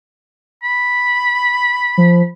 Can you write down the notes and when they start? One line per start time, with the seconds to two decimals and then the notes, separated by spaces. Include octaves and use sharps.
0.63 B5
1.98 F3